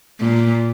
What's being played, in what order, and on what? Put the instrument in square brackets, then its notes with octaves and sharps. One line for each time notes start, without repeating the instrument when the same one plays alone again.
[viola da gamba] A#2